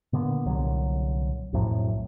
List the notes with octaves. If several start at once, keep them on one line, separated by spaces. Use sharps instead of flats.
A#2 D3 B3
C2 A#2 D3 F#3
B1 F2 A2 F#3